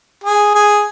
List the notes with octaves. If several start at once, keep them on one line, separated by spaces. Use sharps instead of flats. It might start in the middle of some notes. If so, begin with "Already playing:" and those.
G#4
G#4